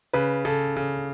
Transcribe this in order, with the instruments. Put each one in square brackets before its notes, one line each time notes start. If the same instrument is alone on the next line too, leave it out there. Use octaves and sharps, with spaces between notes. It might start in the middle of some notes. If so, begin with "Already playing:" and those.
[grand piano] C#3 [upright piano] B4
[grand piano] C#3 [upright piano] A4
[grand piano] C#3 [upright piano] A4